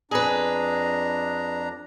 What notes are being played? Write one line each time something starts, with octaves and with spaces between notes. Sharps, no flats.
F2 D4 G#4 B4 A#5